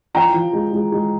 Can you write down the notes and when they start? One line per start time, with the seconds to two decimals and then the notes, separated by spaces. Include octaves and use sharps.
0.14 F3 G5 A#5
0.34 F3
0.53 G#3
0.73 G#3
0.92 G#3